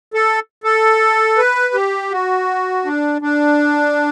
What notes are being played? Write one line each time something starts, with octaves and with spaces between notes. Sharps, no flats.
A4
A4
B4
G4
F#4
D4
D4